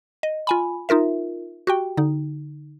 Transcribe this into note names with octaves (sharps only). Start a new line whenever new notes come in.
D#5
F4 G#5 B5
D#4 F4 A#4 E5
F#4 G4 G5
D3 D#4